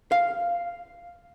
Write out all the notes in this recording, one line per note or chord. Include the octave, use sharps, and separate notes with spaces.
F5